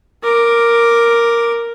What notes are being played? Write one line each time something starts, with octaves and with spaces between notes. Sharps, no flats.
A#4 D6